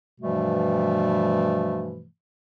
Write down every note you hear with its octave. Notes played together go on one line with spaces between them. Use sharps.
G2 B2 E3 F3 G3 A3